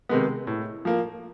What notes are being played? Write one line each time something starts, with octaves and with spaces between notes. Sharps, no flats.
C3 D#3 G#3 B3
A2
F3 A#3